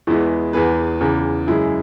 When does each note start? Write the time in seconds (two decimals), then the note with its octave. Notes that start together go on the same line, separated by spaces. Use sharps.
0.07 E2 E3 G#3 B3 E4
0.53 E2 E3 B3 G#4 B4
1.01 E2 C#3 E3
1.47 F#2 C#3 G#3 E4 G#4